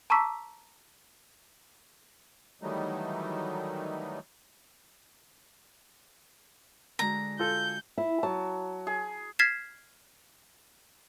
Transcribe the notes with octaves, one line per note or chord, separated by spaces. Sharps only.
A5 A#5 C#6 D6 E6 B6
D#3 E3 F#3 G3 A3 D#4
D3 G#3 F#4 A#5
F4 A4 G6
E4
F#3 A5
G#4
F6 G#6 A6 B6 C7 E7